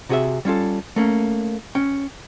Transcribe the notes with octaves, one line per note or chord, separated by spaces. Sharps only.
C3 F#4 G#4 C#5 E5
G3 C#4 F4 A4
A3 A#3 C#4
C#4 G5